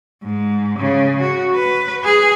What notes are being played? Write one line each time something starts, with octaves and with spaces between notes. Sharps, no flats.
G#2
C#3
F#4
B4
G#4